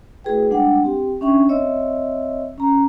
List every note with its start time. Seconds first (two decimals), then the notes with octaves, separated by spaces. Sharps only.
0.24 A3 E4 F#4 G#4 B4 G5
0.50 G3 G#3 D4 F#5 G5
0.84 C4 G4 G5
1.21 C#4 D4 E5 G5 C#6
1.49 C4 C#5 D#5 E5 E6
2.58 C#4 A#5